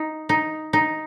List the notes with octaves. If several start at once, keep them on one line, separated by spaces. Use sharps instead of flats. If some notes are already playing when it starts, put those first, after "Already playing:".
Already playing: D#4
D#4
D#4